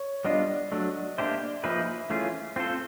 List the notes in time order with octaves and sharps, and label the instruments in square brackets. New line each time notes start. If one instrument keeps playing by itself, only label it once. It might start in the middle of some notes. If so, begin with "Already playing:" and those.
Already playing: [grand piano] C#5
[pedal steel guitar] G3 B3 D4 F4 [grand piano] D#5
[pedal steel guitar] F#3 A3 D4
[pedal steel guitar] A#3 D4 G4 C5 [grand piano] E5
[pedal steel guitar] F3 A#3 D#4 G#4 B4 [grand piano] E5
[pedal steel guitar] E3 A3 C#4 F4 G#4
C4 F4 A4 C5